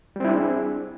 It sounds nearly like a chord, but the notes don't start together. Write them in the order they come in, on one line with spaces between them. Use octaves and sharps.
G3 C4 E4 D4 G#4